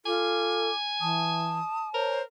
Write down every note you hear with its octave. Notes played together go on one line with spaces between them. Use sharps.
F4 A4 G#5 D6
E3 A5 D#6
A#4 C5 C#5